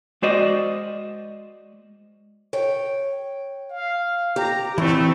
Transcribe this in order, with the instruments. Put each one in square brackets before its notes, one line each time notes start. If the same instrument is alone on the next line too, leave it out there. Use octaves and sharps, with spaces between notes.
[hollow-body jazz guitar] G#3 F#4 C5 D5 D#5
[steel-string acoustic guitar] C#5 G5
[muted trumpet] F5
[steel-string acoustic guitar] G4 [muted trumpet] A#5
[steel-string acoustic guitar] E2 [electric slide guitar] E3 C4 [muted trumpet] A3